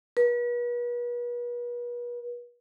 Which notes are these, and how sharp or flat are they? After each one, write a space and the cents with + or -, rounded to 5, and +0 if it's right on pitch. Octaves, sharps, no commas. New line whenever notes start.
B4 -40